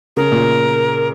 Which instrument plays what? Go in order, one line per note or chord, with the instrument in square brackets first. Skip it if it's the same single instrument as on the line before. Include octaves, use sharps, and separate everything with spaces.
[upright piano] C#3 [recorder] A#4
[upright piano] A#2